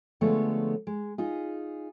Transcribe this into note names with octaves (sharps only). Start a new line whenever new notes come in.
D3 F3 G#3 A3 B3 C#5
G#3
D#4 F4 G#4